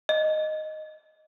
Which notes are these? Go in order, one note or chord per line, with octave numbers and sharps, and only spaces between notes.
D#5